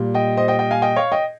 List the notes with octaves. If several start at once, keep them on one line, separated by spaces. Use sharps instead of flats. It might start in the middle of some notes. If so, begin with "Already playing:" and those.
Already playing: A#2 G3
D#5 G5
C5 D#5
D#5 G5
D#5 G5
F5 G#5
D#5 G5
C#5 F5
D#5 G5